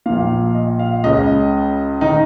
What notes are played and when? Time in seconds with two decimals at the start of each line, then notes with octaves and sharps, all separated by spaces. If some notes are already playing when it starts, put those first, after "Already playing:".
0.06 A#1 A#2 F5
0.55 D#5
0.79 F5
1.04 C#2 C#3 D#5
2.01 D#3 D#4